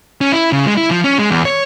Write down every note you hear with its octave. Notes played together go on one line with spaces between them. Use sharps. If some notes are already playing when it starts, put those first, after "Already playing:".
C#4
E4
C#3
G#3
E4
F3
C#4
G#3
E2
C#5